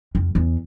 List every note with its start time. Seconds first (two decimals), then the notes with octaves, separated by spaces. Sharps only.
0.15 F2
0.35 E2